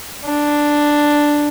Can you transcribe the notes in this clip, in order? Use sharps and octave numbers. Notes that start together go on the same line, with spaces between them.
D4